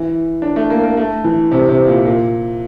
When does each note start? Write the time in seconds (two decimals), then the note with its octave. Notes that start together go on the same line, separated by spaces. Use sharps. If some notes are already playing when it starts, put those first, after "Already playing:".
Already playing: E3
0.42 D4
0.56 A3
0.70 A#3
0.83 A#3
0.97 A3
1.24 E3
1.52 C3
1.69 C3
1.87 A#2
2.05 A#2